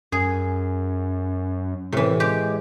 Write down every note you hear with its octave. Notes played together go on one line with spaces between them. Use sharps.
F#2 G#4
A2 C3 E3
G#3 G4